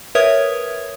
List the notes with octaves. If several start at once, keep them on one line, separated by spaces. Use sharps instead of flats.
A#4 B4 C#5 E5 D#6 G#6